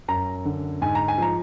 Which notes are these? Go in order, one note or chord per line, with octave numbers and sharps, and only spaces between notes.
F#2 A#5
D3
G#2 G#5
A#5
G#5
F3 A#5